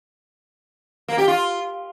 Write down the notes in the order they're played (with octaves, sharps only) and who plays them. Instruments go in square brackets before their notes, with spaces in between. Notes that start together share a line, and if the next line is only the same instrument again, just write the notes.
[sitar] A#3
G4
F4